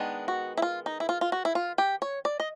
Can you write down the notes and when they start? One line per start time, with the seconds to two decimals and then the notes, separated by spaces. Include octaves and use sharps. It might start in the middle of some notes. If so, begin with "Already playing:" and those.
Already playing: D#3 G#3 B3 D4
0.28 F#4
0.58 E4
0.62 F4
0.86 D#4
1.00 E4
1.09 F4
1.21 F4
1.32 F#4
1.45 E4
1.55 F4
1.78 G4
2.02 C#5
2.25 D5
2.40 D#5